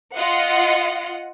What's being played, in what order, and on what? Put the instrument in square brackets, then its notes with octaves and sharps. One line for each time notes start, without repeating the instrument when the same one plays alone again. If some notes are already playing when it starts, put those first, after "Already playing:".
[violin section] F4 D#5 F#5